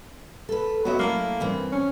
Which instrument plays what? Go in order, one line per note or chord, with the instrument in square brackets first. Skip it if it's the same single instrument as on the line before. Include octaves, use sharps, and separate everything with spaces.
[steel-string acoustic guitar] A4 B4
[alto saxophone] F#3 [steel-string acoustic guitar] B3 D#5 E5
[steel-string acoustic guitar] F#3 A3 E4 [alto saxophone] A#3
[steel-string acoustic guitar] G2 E3 C4
[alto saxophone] C#4